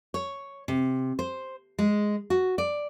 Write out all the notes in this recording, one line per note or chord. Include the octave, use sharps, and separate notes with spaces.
C#5
C3
C5
G#3
F#4
D5